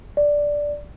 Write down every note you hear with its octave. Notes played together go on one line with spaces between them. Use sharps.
D5